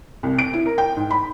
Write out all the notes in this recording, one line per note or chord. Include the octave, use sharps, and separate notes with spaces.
C2
D7
E4
A#4
G5
G#2
B5